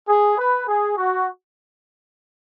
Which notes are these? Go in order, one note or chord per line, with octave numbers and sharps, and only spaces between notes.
G#4
B4
G#4
F#4